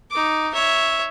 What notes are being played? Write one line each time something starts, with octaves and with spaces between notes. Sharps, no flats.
D#4 D6
C#5 E5